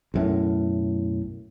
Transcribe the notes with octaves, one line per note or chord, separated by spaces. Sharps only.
B1 F#2 A2